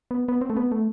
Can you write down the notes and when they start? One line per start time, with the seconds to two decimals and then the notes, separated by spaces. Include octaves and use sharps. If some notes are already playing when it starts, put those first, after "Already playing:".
0.11 B3
0.28 B3
0.41 C4
0.50 A3
0.57 B3
0.72 A3